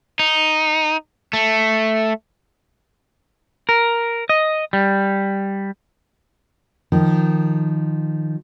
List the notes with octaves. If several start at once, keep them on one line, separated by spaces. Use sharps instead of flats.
D#4
A3
A#4
D#5
G3
D#3 F3